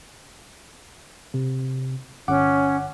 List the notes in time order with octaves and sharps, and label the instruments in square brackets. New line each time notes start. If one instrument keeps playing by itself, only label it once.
[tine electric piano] C3
[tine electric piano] G1 F#5 D6 [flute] C#4